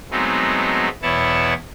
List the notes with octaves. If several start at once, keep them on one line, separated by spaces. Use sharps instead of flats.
F#3 G#3 A3 B3 C4 D#4
E2 B2 B3 E4 C#5 A5